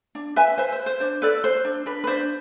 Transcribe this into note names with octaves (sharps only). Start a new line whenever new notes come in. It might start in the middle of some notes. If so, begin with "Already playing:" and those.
D4
B4 E5 G#5
B4 C5 E5
C5
B4
C5
D4 C5
A4 B4 D5
A4 C5
D4
D4 B4
B4
D4 C5